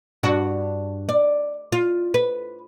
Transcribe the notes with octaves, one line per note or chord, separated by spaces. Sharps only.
G2 D4 F#4
D5
F4
B4